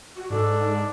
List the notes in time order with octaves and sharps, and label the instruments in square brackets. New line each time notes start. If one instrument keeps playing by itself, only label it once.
[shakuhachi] F#4
[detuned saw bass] G#2 [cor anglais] D4 [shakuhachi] A4